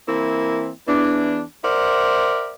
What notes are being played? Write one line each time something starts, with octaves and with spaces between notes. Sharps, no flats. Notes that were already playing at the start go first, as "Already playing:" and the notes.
E3 A#3 C4 E4
E2 E3 D4
A#4 C5 D5 E5 F#5